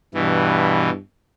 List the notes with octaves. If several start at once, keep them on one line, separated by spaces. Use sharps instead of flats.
G2 B2 E3